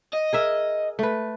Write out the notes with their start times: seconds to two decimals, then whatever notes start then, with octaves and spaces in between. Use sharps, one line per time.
0.13 D#5
0.33 G#4 A#4 E5
0.99 A3 B4